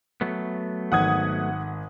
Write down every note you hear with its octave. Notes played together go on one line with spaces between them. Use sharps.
F#3 A3 B3
G#1 F#5 D#6 G#6